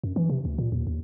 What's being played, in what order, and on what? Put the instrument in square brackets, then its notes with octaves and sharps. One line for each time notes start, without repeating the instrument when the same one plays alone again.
[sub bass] F#2
E3
C3
D2
A#2
D#2
D#2